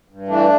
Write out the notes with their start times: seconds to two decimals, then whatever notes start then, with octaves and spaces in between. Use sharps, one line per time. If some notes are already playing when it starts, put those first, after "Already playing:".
0.08 G2
0.28 E3 A3 D4